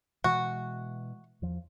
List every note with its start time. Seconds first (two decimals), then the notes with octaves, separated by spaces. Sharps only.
0.24 B2 E3 G#3 F#4
1.42 E2 F3